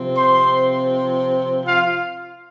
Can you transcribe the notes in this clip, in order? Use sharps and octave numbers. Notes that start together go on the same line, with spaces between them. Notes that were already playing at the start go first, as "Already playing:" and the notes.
Already playing: C3 F3 C4
C5 C6
F4 F5